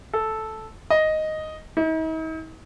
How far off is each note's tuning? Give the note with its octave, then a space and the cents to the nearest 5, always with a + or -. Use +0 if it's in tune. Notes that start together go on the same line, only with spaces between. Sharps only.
A4 -5
D#5 +0
D#4 +45